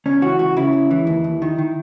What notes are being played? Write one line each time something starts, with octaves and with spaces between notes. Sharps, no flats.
C#2 C#4
E3 F#4
C#2 F#4
C#3 E4
C#2
E3
D#2
D#2
D#3
D#3